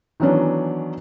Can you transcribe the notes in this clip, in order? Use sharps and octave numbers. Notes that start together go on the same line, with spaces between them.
D#3 E3 F#3 B3 C#4 D4